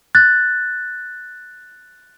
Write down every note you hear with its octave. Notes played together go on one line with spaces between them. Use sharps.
F#6 A6